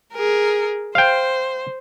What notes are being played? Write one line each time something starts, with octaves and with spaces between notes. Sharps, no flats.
G#4 A#4
C5 F5 G5